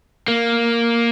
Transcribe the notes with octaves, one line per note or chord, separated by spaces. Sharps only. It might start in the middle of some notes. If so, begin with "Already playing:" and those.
A#3